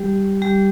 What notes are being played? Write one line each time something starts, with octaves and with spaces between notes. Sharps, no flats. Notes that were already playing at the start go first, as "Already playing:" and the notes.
Already playing: G3 G4
G3 G4